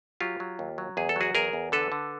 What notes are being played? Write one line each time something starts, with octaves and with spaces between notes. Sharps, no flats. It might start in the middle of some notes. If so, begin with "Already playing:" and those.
F#3 F4 G4
F#3
D#2
F#3
E2 G#4
A4
F#3 F#4 G#4
E2 G#4 A#4
E2
D3 A4 B4
D3